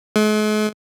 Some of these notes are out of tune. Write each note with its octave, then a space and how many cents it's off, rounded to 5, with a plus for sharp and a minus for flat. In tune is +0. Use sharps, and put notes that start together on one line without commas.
G#3 +45